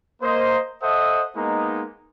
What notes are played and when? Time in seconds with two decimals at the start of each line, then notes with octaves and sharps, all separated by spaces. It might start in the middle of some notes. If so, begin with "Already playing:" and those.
0.22 A#3 C5 D#5
0.83 A4 C5 D#5 E5 F#5 D#6
1.36 G#3 A#3 B3 D#4